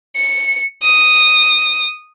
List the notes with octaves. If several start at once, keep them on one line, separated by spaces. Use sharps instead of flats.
C#7
D#6